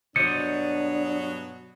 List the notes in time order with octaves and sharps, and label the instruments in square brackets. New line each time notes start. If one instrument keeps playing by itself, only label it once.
[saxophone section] G2 B2 F#3 [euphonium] D4 [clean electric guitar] C5 D5 D#5 [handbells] C#7